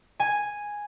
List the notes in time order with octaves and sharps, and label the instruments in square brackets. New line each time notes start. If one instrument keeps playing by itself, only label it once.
[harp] G#5